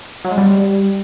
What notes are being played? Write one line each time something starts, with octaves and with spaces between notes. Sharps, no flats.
F#3
G#3
G3